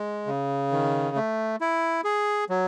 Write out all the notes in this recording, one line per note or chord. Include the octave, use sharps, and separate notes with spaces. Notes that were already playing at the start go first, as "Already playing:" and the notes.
Already playing: G#3
C#3
D#3
A3
E4
G#4
F#3